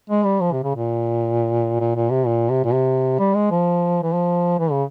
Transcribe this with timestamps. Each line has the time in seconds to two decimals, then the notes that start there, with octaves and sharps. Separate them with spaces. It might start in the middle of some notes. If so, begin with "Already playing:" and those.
0.10 G#3
0.25 G3
0.41 F3
0.52 C3
0.63 C#3
0.76 A#2
1.80 A#2
1.96 A#2
2.11 C3
2.26 A#2
2.50 C3
2.65 A#2
2.73 C3
3.19 G3
3.35 G#3
3.51 F3
4.03 E3
4.13 F3
4.59 E3
4.71 C#3